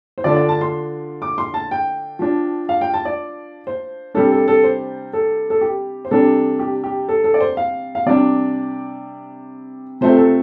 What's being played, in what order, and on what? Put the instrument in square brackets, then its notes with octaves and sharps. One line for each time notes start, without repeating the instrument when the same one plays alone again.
[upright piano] C5
D3 F3 D4 D5
D5
A5
C6
D6
C6
A5
G5
F3 D4
F5
G5
A5
D5
C5
C3 G3 D4 A4
A4
A4
C5
A4
A4
G4
C5
C3 G3 D4 A4
G4
G4
A4
A4
D5
C5
F5
F5
C3 G3 D4 D5
C3 F3 A3 C4 C5
A4